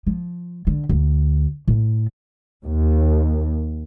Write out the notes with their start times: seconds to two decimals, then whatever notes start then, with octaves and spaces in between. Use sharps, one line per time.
0.07 F3
0.67 D3
0.89 D2
1.68 A2
2.65 D#2